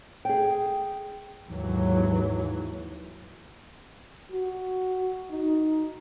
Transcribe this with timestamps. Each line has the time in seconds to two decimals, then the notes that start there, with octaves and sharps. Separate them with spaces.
0.25 G#4 G5
1.47 D#2 G#2 E3 F#3
4.31 F#4
5.30 D#4